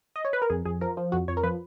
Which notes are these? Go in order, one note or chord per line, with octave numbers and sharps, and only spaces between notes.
D#5
C#5
B4
A#4
F2 G#4
F2 G#4
F3 A#4
F3
F2 F#4
F2 C#5
A#4
F3 B4